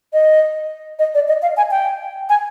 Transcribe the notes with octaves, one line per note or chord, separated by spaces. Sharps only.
D#5
D#5
D5
D#5
F5
G#5
G5
G#5